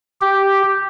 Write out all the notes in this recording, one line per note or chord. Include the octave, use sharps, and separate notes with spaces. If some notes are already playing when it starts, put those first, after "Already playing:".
G4